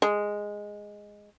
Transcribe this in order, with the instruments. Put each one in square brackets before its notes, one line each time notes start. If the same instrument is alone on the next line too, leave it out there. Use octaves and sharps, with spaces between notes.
[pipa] G#3